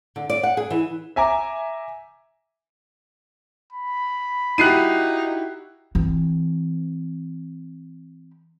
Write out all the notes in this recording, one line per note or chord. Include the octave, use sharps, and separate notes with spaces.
D3
D5
F#5
G#4
E3
E5 G#5 A#5 D6
B5
D#4 E4 F#4 G4 F#6 C7 D#7
E3 C4